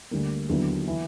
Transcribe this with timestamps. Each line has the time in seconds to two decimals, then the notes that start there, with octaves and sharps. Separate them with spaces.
0.11 D2 D3 G3 A#3
0.49 D#2 D3 F#3 B3 E4
0.87 E3